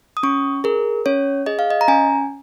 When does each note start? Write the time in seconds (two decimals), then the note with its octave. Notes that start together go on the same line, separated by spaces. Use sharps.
0.17 D#6
0.23 C#4 C#6
0.64 G#4 A#4
1.06 C#4 C#5
1.46 G#4 D#5
1.59 F5
1.70 D#5
1.81 A#5
1.88 C#4 G#5